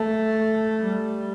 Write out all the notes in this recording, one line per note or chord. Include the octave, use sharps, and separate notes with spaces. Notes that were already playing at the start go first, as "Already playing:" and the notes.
Already playing: A3
G3